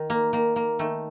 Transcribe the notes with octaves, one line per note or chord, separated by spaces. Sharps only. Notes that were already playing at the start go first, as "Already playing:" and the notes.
Already playing: D#3
A#3
D#3 A#3
A#3
D#3 A3